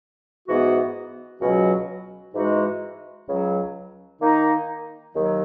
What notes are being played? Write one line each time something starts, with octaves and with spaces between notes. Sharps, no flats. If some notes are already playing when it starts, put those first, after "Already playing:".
G#2 E3 B3 F#4
C#2 B2 F#3 C#4 F#4
G#2 E3 G#3 D#4 F#4
C#2 C#3 F#3
D#3 A#3 D#4
D#2 D#3 F#3